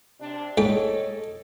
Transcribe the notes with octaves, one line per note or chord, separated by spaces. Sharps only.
C3 D4
G#2 A4 C#5 D#5 G5